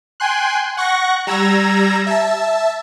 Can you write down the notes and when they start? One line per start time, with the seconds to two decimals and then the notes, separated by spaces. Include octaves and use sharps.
0.20 G5 G#5 C6 F#6
0.77 F#5 C#6 F#6 A#6
1.27 G3 A#5 E6 G#6 A#6
2.07 E5 A5